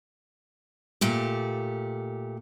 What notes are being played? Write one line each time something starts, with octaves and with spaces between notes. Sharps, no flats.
A#2 A3 G4